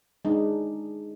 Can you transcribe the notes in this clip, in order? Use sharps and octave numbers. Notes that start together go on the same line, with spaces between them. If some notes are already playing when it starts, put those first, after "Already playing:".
G#3 D4 D#4